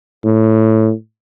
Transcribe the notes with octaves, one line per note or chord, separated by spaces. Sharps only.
A2